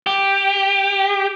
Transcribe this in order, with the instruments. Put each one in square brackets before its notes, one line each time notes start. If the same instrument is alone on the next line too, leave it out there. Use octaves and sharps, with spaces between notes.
[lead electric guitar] G4